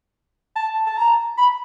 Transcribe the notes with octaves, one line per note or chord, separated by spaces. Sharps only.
A5
A5
A#5
B5